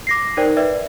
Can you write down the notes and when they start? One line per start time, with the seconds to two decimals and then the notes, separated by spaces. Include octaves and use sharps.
0.07 D6 A#6 C7
0.37 D#4 A#4 C5 D5 G5
0.57 B4 D5 E5